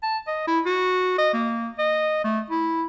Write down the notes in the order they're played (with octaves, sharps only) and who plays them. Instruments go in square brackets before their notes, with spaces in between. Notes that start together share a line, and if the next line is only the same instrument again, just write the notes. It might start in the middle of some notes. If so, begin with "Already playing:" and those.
[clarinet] A5
D#5
E4
F#4
D#5
A#3
D#5
A3
E4